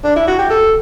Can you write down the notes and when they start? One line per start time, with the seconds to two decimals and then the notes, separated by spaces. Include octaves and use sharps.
0.04 D4
0.16 E4
0.27 F#4
0.39 G4
0.50 A4